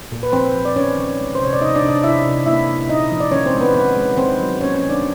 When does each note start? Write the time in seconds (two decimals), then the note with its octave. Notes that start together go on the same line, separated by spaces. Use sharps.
0.12 A#2
0.23 B4
0.32 F3 C4 C5
0.54 F3
0.65 D5
0.76 D#3 C#4 C#5
0.97 D#3
1.19 G#3
1.35 C5
1.40 C3 C#5
1.53 D5
1.61 C3 D#4 D#5
1.75 D4 D5
1.82 C3
1.89 D4 D5
2.04 C3 E4 E5
2.25 C3
2.46 A#3 E4 E5
2.68 A#3
2.89 A#2 D#4 D#5
3.11 F3
3.20 D5
3.31 D#3 C#4 C#5
3.46 C4 C5
3.54 G#3
3.61 B3 B4
3.74 D#3 B3 B4
3.96 G#3
4.17 D#3 C4 C5
4.40 F#3
4.61 A#3 C#4 C#5
4.74 C#4 C#5
4.82 D#3
4.89 D4 D5